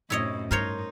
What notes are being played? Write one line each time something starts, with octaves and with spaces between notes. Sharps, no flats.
F#2 A2 C3 E4 C#5 D#5
G2 D#4 A#4 C5 C#5